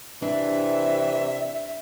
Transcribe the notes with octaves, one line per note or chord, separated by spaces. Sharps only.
C3 E3 D4 E5